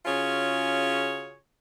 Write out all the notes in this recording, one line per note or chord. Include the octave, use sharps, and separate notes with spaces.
C#3 C#4 F4 F#4 G#4 C#5